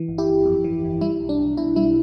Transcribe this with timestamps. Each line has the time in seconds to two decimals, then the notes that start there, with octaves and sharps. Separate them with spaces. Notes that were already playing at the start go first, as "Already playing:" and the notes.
Already playing: E3
0.08 G1
0.18 E4 G4
0.27 G1
0.46 F2
0.64 E3
0.83 G1
1.01 G3 E4
1.20 B1
1.29 D4
1.39 B1
1.57 B2 E4
1.76 G3 E4